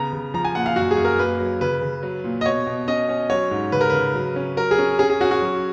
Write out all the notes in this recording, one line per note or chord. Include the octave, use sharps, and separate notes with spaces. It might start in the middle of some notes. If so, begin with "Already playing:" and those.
Already playing: C#3 B3 A#5
C#3
F3 A#5
G#5
A#2 F#5
F5
F#2 F#4
G#4
F#2
A#4
A#3 B4
F#3
C#3 B4
C#3
F#3
A#2
D#5
B2 C#5
B2
C#4 D#5
C#4
F#3 C#5
G#2
C#3 B4
A#4
C#3 B4
F#3
C#4
F#3 A#4
G#4
C#4
C#4 G#4
G#4
C#4 F#4
F#4
F#3